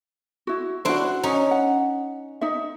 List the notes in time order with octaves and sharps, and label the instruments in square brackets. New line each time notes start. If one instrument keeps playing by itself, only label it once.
[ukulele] E4 F#4
[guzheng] D4 E4 [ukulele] F#4 C5
[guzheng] C#4 D#4
[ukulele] F#5
D#4 E5